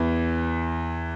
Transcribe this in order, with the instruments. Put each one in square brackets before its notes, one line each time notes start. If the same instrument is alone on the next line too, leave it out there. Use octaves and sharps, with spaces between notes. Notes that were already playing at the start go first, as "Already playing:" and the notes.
Already playing: [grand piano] E2 E3